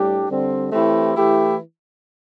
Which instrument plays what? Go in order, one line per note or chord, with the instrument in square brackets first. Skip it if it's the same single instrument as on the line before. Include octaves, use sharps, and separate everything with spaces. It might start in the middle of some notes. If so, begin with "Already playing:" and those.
Already playing: [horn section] A2 G3 D4 G4
D3 G3 C4
E3 A3 C4 E4 G4
E3 A3 E4 G4